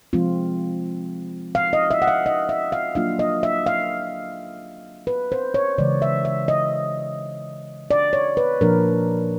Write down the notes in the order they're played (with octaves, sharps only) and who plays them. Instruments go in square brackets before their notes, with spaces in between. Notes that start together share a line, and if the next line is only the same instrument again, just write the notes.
[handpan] F3 G#3 C4 F4
F5
D#5
E5
F#5
F5
D#5
E5
F5
F#3 A#3 D4 F4 F5
D#5
E5
F5
B4
C5
C#5
C#3 E3 G#3 D5
E5
E5
D#5
D5
C#5
B4
A#2 F3 A#3 D4 A#4